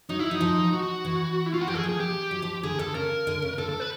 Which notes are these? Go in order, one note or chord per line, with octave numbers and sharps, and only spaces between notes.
F#3 D#4
E4
F#3 D#4
F3
F#4
E3
E4
F4
F#4
F3 G4
E3 A4
G#4
F3
G#4
G4
F#3
F3
D3 G#4
D3 A4
C#3 A#4
D3
C#3
D3 A4
A4
B4